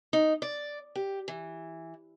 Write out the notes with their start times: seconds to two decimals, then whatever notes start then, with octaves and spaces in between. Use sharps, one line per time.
0.13 D#4
0.42 D5
0.95 G4
1.28 E3